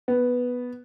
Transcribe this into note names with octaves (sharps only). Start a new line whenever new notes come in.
B3